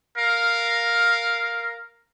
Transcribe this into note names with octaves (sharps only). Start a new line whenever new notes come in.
A#4 F5